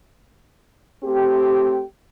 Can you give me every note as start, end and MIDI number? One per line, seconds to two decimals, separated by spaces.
1.03 1.82 57
1.03 1.82 60
1.03 1.82 67